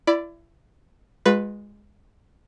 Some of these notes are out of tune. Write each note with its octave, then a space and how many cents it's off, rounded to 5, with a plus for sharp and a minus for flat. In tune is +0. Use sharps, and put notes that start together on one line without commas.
E4 +30 D5 +0 B5 +0
G#3 -10 F4 +35 B4 +0